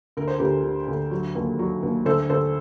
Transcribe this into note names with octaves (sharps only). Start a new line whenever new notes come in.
D2 A#4
C5
D2 G4 A#4
D3
D2
F#3
D#2
F#3
D#2
D2 A4 C5
D2 A4 C5